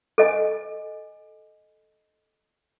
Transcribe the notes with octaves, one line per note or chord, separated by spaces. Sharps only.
A4 D#5 G#5